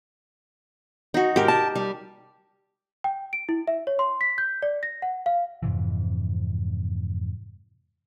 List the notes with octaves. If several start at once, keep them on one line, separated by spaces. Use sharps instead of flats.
D#4 F#4
G#2 G4 A#4
A5
G3
G5
D7
E4
E5
C#5
C6
B6
G6
D5
A#6
F#5
F5
F2 G#2 C3 E3